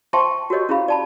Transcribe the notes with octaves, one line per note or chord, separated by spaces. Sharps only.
C5 E5 G5 A5 C6 C#6
F#4 G4 A#4 C#5 D#5
C#4 E4 G#4 F5 B5
D5 A5 B5